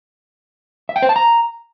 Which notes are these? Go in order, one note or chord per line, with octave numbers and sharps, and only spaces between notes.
E5
G5
C5
A5
A#5